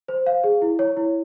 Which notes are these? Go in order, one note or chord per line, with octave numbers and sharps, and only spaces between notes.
C5
F5
G#4
E4
C#5
E4